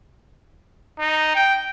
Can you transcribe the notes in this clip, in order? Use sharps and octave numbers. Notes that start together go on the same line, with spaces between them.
D#4
G5